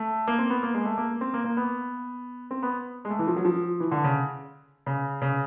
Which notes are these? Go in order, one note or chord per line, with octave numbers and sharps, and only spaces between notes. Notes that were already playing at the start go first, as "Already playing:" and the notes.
Already playing: A3
A#3
C4
B3
A#3
G#3
A3
A#3
C4
A#3
A#3
B3
C4
B3
G#3
A3
E3
F3
F#3
F3
E3
D3
C#3
C#3
C#3